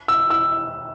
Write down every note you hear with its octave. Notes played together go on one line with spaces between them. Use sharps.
E6
E6